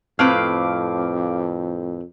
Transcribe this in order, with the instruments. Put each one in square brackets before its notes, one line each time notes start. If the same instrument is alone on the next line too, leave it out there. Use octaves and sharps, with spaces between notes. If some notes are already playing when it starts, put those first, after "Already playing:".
[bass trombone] F2 [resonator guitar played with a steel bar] A2 C4 B4 [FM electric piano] F5 D6